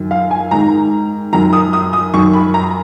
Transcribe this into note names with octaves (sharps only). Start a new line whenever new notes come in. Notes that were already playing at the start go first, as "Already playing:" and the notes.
Already playing: F#2 D#3
F5
G#5
G#2 D#3 A#5
F#2 D#3 A#5
D#6
D#6
D#6
F#2 D#3 C#6
B5
A#5